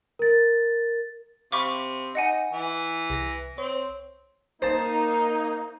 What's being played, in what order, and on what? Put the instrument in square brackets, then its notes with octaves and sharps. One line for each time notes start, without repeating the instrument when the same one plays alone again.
[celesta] A#4 A6
[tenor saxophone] C3 [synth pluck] F5 B5 [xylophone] C#6 D6
[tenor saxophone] D#4 [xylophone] D#5 F#5 G#5
[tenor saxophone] E3
[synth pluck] C2 A#6
[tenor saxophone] C4 [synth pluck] C#5
[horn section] A#3 D#4 [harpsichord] C5 A5